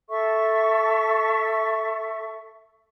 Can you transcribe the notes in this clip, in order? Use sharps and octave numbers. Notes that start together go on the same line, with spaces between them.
A4 E5 C#6